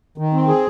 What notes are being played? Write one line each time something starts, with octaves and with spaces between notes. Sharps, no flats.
D#3
C4
G#4